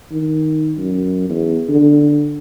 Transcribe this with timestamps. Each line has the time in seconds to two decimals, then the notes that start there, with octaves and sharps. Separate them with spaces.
0.12 D#3
0.78 F#2
1.29 E2
1.69 D3